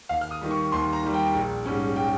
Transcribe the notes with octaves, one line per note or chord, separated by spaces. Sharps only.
D#2 F5
F6
D#6
D#3 G3
C#6
D#2 C6
A#5
D#3 G3
G5
A#1
G#2 G3 C#4
G5